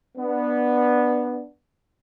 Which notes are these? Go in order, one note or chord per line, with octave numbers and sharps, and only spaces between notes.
B3 D4